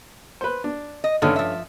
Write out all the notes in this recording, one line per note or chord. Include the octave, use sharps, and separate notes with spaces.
B4 C5
D4
D#5
G2 D3 D#3 A3 C#4
F3 E5